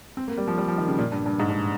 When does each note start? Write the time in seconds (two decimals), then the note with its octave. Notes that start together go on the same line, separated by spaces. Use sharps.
0.17 C4
0.28 A#3
0.38 G3
0.48 F3
0.58 G3
0.68 F3
0.78 D#3
0.88 C#3
0.98 A#2
1.12 G2
1.26 G2
1.40 G#2
1.49 G2